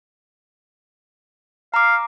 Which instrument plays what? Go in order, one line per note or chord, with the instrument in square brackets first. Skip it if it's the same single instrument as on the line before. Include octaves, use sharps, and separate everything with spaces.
[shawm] F5 [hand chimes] A#5 D6